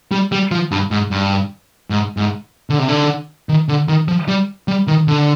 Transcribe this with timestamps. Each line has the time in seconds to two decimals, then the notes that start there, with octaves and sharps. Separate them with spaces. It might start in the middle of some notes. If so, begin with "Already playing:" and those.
0.12 G3
0.32 G3
0.51 F3
0.71 G2
0.91 G#2
1.11 G2
1.90 G#2
2.17 G#2
2.70 D3
2.79 C3
2.88 D3
3.49 D#3
3.69 D3
3.88 D#3
4.08 F3
4.28 G3
4.68 G3
4.87 D#3
5.08 D3